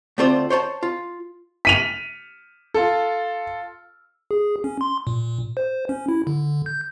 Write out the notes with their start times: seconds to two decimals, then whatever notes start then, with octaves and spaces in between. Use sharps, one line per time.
0.18 D2 A3 C4 F4 C5 D5
0.50 C5 C#5 F#5 A5
0.83 F4
1.65 B6 D#7 F7
2.74 F4 A4
4.31 G#4
4.64 C#4
4.81 C6
5.07 A#2
5.57 C5
5.89 C#4
6.09 E4
6.27 D3
6.66 G6